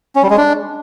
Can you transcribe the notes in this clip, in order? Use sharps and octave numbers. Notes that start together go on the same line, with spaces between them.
C#4
G3
G#3
D4